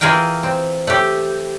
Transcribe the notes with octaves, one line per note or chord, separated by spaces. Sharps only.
E3 F4 G#4 A#4 F5 G5
C4
A3 G4